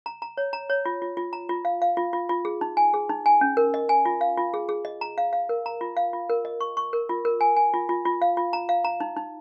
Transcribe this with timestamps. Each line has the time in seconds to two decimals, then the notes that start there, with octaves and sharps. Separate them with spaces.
0.06 A#5
0.22 A#5
0.37 C#5
0.53 A#5
0.70 C#5
0.85 F4
1.02 F4
1.17 F4
1.33 A#5
1.49 F4
1.65 F5
1.82 F5
1.97 F4
2.13 F4
2.29 F4
2.45 G#4
2.61 D#4
2.77 G#5
2.94 G#4
3.09 D#4
3.26 G#5
3.41 C#4
3.57 A#4
3.74 D#5
3.89 G#5
4.05 F4
4.21 F5
4.38 F4
4.54 G#4
4.69 G#4
4.85 D#5
5.01 A#5
5.18 F5
5.33 F5
5.49 A#4
5.66 A#5
5.81 F4
5.97 F5
6.13 F4
6.30 A#4
6.45 D#5
6.61 C#6
6.77 C#6
6.93 A#4
7.09 F4
7.25 A#4
7.41 G#5
7.57 G#5
7.74 F4
7.89 F4
8.05 F4
8.22 F5
8.37 F4
8.53 A#5
8.69 F5
8.84 A#5
9.00 D#4
9.17 D#4